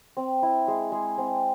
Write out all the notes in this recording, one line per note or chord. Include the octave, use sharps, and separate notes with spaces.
C4
E4
G#3
G#3
C4